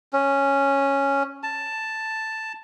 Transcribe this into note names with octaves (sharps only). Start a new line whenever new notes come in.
C#4
A5